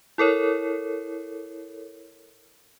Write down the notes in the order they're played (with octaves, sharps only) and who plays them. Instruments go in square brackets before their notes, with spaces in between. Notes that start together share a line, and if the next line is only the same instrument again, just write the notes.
[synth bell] E4 A4 A#4 C#5